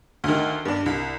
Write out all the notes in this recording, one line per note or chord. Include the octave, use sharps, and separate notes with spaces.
D2 D#3
G2 D4
C2